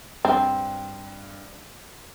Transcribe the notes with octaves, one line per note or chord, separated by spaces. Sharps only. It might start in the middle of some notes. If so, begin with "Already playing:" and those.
G2 C4